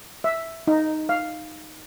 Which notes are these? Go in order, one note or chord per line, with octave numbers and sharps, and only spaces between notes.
E5
D#4
F5